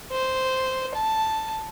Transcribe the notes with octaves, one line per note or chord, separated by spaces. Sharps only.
C5
A5